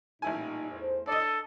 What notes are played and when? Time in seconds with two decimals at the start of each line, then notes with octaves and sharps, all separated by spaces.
0.22 A1 A#2 G3 D#4 E4 G#5
0.72 E2 A3 C5
1.07 D4 A4 D5 D#5